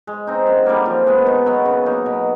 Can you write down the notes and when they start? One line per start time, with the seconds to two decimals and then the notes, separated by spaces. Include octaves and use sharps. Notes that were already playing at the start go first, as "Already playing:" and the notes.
0.07 G#3
0.27 C4 D#4
0.47 F#2
0.66 D3 G3 A#3
0.86 F3
1.07 G#3 B3
1.27 D#3
1.46 F#3 B3
1.65 C#3
1.86 F#3 A#3 D#4
2.06 B2